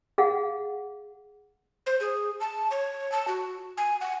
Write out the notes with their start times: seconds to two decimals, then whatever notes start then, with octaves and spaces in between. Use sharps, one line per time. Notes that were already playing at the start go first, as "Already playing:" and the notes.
0.18 G#4 F5 F#5
1.86 C5
2.00 G#4
2.40 A5
2.71 C#5
3.12 A5
3.28 F#4
3.77 G#5
4.01 F#5